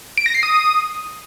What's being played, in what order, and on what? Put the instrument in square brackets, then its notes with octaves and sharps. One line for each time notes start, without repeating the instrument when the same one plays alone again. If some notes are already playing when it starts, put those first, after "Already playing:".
[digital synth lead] D7
A#6
C7
D#6